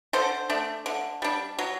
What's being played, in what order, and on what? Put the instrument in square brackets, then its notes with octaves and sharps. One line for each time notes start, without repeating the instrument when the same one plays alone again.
[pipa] D3 A4 C5
A3 D4
D3
G3 D4
F#3